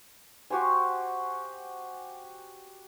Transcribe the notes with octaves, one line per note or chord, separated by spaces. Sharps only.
F#4 G4 C5 G#5